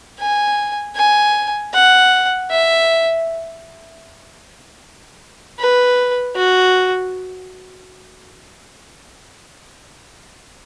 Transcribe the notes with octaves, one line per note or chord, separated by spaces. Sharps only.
G#5
G#5
F#5
E5
B4
F#4